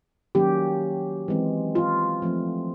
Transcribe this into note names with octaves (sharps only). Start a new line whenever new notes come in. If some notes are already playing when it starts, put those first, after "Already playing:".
D#3 F#3 A#3 C#4 G4
E3 G#3 C4
F4
F3 A3 C4